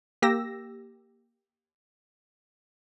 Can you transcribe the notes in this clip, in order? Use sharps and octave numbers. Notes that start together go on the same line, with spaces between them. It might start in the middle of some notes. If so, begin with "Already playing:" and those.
A#3 G4 E6 A#6